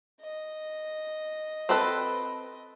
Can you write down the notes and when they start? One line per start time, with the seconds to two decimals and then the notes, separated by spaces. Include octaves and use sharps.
0.21 D#5
1.69 C4 A4 B4